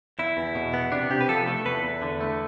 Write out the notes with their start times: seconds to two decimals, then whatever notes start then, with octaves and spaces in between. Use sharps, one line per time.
0.19 E2 E4
0.37 E2
0.55 B2
0.74 B3
0.92 C3 D4
1.10 C3 G4
1.21 B4
1.29 F3 A4
1.47 A3 A4
1.65 E2 B4
1.84 E2
2.02 D3
2.21 A3